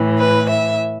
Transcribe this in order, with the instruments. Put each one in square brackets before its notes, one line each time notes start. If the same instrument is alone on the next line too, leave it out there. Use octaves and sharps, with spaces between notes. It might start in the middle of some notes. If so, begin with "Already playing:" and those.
Already playing: [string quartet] A2 E3
B4
E5